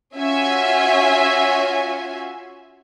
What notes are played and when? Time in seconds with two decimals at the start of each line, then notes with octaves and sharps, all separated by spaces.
0.17 C#4 F4 F#4 E5 G#5